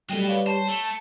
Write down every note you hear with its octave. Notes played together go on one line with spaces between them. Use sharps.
F#3 G3 A3 F#4 D#5 G5
B4 C#5 D5 F5
C5 C#5 A5
A3